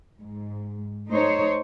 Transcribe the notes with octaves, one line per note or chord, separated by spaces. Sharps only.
G#2
A3 D#4 C5 C#5